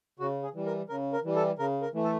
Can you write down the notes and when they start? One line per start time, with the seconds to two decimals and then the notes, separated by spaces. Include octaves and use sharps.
0.19 C#3 F#4
0.43 G#4
0.54 E3 G3
0.66 A#4
0.89 C#3 A#4
1.13 A#4
1.24 E3 G3
1.36 A4
1.59 C#3 A#4
1.82 A#4
1.94 E3 A3
2.04 A4